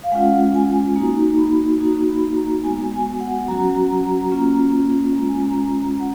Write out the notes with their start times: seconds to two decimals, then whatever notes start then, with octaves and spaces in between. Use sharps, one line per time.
0.03 F5
0.12 G#3 C#4 F4 F#5
0.54 G#5
0.96 A#3 D#4 F#4 A#5
1.38 B5
1.79 A#3 D#4 F#4 A#5
2.08 B5
2.36 A#5
2.63 G#3 B3 F#4 G#5
2.92 G#5
3.20 F#5
3.48 F#3 C#4 F#4 A#5
4.32 A#3 C#4 F4
5.15 G#3 C#4 F4 A#5
5.28 G#5
5.42 A#5
5.58 A#5
6.00 F#5